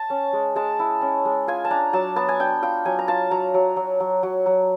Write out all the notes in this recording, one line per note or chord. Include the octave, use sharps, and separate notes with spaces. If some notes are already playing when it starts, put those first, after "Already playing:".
Already playing: A5
C#4
G#3
G#3 A5
E4
C#4
G#3
F4 G#5
A5
D4 A#5
F#3 A5
B3 A5
G#5
D4 G5
F4 G5
F#3 G#5
A#5
F4 A5
F#3 A#5
F#3
F#3
F#3
F#3
F#3